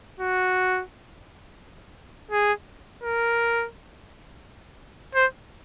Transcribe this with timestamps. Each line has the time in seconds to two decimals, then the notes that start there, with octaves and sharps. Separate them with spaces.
0.19 F#4
2.31 G#4
3.03 A#4
5.15 C5